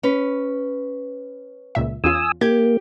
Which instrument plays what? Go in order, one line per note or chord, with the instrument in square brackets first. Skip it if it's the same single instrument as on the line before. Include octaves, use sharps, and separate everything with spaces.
[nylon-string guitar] C#4 B4
[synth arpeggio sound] C#2 A#2 E5
[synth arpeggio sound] E2 C#4 F4 [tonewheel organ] G#5 D#6 E6
[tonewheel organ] A#3 [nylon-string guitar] G4 [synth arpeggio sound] G#6